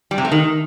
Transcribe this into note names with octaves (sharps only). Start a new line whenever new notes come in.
G3
C3
A3
D#3